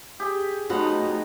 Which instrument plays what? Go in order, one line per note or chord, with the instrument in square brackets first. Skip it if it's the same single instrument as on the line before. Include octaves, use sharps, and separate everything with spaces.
[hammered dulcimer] G4 G#4 G5
[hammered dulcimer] F3 B3 [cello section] A3 D#4 [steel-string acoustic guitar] C#4 F#4 C5